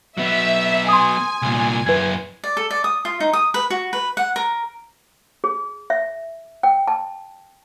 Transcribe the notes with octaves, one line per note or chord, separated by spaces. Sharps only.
F#3 B3 E5
G#5 C6 D#6
C2 A#2
F#2 E4 B4 G#6
D5
A4
D5
D#6
F4
D#4
D#6
B4
F#4
B4
F#5
A#4
G#4
E5
G5
A5